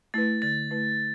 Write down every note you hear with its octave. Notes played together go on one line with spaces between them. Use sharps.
A3 E4 B4 A6
D3 A6
A3 E4 B4